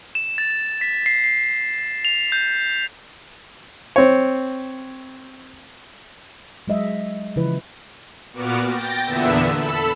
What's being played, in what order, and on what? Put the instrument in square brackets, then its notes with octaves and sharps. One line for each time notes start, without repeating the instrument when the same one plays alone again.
[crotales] E7
A6
B6
C7
C7
F7
G6
[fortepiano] C4 C#5
[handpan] F#3 G#3 D#5 E5
C#3 E3 F3 E4 B4
[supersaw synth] A#2 B3 F#4 D6 F6
G5 A6 A#6
E2 A#2 D3 B3 E5 E6
A4 B5 E6